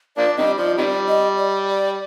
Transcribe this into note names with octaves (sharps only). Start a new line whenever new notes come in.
F3 A#3 D4 D5
C3 D#3 G3 D#5
F3 D5
C3 D#3 G3 D5 D#5
D#5
D5
D5